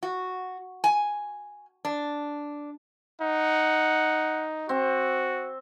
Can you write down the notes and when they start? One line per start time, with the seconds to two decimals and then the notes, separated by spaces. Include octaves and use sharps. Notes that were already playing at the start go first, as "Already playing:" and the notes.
0.03 F#4
0.84 G#5
1.85 D4
3.21 D#4 F#5
4.69 C4 F#4